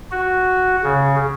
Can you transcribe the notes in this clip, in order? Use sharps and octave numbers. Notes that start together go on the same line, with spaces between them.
F#4
C#3